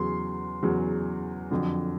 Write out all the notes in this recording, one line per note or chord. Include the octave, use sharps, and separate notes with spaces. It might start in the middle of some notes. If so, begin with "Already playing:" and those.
Already playing: E2 C#3 F#3 C6
E2 C#3 F#3
F2 D3 F#3